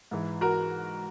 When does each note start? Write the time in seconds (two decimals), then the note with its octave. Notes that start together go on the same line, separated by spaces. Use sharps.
0.11 G#2 E3
0.41 F#4 A#4